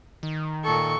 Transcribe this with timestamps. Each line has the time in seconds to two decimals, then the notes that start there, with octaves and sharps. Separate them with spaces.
0.23 D#3
0.64 A#2 A4 C#6